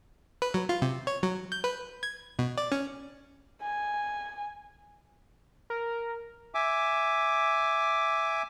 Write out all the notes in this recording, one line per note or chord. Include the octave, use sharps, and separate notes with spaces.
B4
F#3
F4
C3
C#5
F#3
G6
B4
G#6
B2
D5
C#4
G#5
A#4
E5 G#5 D6